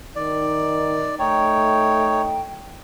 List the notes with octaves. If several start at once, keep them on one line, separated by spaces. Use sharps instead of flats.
D#3 D5
A3 D#4 C#5 G5